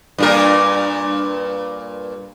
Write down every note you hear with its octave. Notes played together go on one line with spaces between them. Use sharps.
G2 A#2 A#4